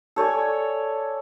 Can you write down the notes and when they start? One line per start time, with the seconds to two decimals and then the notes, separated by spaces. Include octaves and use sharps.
0.16 A4 C#5 D5 G#5